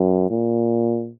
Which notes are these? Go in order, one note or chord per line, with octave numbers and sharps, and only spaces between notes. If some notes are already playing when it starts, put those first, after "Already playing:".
Already playing: F#2
A#2